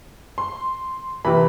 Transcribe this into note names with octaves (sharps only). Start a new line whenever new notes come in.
C6
C3 E3 B5